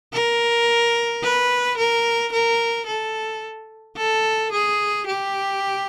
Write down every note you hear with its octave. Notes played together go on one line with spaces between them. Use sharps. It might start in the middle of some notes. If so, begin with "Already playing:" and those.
A#4
B4
A#4
A#4
A4
A4
G#4
G4